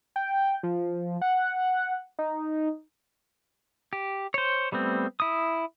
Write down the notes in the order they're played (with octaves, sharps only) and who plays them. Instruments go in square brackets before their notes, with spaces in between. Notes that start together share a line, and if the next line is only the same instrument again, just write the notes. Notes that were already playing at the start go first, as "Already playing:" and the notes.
[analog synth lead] G5
F3
F#5
D#4
[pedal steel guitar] G4
C5 C#5
G3 A3 B3 C4
E4 D#6